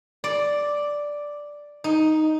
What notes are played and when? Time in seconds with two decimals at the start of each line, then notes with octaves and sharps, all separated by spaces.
0.24 D5
1.84 D#4